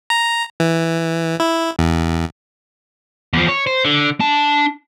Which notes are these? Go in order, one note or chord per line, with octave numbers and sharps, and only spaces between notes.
A#5
E3
E4
E2
E2 F3
C#5
C5
D3
D4 A5